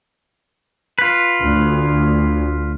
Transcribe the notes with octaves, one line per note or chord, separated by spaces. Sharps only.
F4 B4
D2